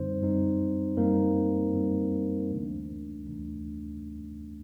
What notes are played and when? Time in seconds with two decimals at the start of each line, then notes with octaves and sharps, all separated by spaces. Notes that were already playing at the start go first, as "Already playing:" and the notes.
Already playing: F#2 D3 G3 C4 D#4 C5
0.21 F#2 D3 G3 C4 D#4
0.97 F#2 D3 G3 A#3 C4 D#4 A#4
1.74 F#2 D3 G3 C4 D#4
2.50 D2 C3 E3 A3 D4
3.27 D2 C3 E3 A3 D4